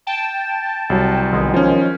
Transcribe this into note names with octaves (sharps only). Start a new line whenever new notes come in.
G5 A5
C2 F#3
B1 D#3 G#3
F3 C#4